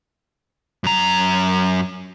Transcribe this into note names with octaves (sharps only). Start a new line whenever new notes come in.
F#2 A#5